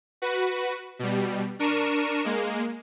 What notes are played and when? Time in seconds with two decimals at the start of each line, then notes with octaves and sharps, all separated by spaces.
0.22 F#4 B4
0.99 B2 G3
1.59 D4 A#4 C#6 D#7 E7
2.25 G#3 A#3